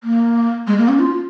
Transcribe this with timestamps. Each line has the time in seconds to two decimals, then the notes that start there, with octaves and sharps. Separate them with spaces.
0.04 A#3
0.67 G#3
0.78 A#3
0.89 C#4
0.99 F4